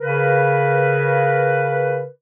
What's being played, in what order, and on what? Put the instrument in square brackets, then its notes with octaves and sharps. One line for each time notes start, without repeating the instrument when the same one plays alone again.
[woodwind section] C#3 A#4 B4